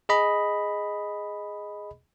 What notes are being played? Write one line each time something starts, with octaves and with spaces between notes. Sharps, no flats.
G#4 D#5 B5